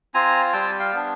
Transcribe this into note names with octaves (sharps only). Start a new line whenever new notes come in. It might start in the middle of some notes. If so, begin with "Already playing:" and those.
C4 F4 G#5 A#5
G3 G5 A5
F5 G5
B3 D4